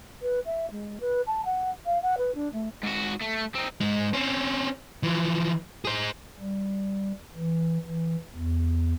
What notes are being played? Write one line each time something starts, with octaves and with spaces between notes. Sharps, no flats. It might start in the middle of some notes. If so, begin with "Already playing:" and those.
B4
E5
G#3
B4
A5
F#5
F5
F#5
B4
D4
A3
G#2 F#4
A3
C4 D#4
G#2 G#3
C4 C#4
E3 F3
G#4 C5
G3
E3
E3
E2